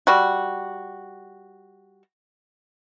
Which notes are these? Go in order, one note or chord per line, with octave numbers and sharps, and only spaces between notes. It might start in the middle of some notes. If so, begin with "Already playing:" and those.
G3 F#4